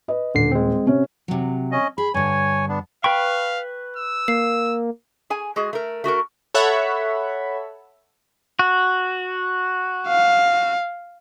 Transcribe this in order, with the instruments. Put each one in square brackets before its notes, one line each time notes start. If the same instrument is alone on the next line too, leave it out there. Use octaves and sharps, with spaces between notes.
[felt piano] B4 D#5
[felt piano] D#1 [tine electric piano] D3 C7
[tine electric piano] G#3 C4
[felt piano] C3 C#4
[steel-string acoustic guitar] C3 F#3
[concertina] C#4 D#5
[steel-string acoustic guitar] G#4 [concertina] B5
[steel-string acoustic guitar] G2 D3 [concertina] C#5 G#5
[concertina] B3 D4
[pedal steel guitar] B4 B5 C#6 [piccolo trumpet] F5 [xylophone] G5
[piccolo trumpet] E6
[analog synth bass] A#3 [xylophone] C7
[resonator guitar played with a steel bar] G#4 G#5
G#3 F#4 G#4
A3 A#4
A3 F#4 G4 A#4
[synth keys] A4 C#5 E5 F#5 B5
[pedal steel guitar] F#4
[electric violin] F5